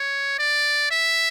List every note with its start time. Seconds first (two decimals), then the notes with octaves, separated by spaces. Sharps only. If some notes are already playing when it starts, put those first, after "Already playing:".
Already playing: C#5
0.39 D5
0.91 E5